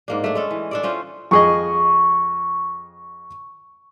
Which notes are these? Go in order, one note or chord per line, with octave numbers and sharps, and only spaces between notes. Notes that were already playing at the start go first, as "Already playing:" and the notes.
G#2 A#3 D4
A3 D4
G#3 C#4 A4
E3
D4 A4 D5
A3 C#4 F4 C5
F2 G#4 D#5 C#6